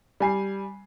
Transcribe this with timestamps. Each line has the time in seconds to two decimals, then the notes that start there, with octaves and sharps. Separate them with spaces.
0.20 G3 G#5 C7